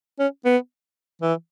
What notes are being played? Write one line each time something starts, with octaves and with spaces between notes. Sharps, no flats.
C#4
B3
E3